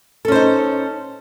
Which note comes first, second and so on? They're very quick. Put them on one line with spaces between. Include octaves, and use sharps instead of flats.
A4 C#4 C5 D#4